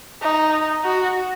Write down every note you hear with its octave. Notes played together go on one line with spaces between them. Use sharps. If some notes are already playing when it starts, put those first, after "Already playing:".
D#4
F#4